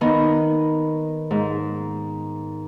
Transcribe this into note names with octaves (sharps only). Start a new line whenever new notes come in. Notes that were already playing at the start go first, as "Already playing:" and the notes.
D#3 B3 D#4
G#2